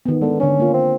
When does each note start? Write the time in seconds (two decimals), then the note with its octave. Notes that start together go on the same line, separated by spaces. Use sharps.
0.06 D#3 B3
0.21 D3 G#3 B3
0.40 D3 C#4 D4
0.60 A#3 F4
0.74 C4